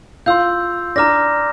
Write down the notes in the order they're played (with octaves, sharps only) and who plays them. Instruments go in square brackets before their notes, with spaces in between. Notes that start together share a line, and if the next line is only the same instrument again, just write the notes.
[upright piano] F4 F5 [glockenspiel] C6 E6 G6
[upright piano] D4 D5 [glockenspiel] A#5 D6 F6 A#6